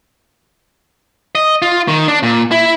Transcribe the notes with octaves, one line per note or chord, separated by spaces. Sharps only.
D#5
F4
D#3
D4
A#2
E4